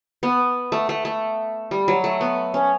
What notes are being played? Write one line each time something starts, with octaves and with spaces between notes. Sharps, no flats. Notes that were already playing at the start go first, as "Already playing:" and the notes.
B3
A3
A3
A3
G3
F#3
A3
B3
C#4